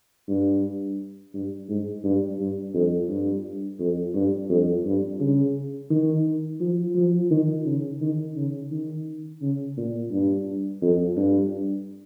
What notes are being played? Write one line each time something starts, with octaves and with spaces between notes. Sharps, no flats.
G2
G2
G#2
G2
G2
F2
G2
F2
G2
F2
G2
C#3
D#3
F3
F3
D#3
C#3
D#3
C#3
D#3
C#3
A#2
G2
F2
G2